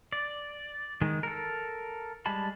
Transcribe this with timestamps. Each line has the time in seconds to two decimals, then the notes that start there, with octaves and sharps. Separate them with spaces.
0.12 D5
1.01 D#3 G#3
1.23 A4 A#4
2.26 G3 G#3 A5 B5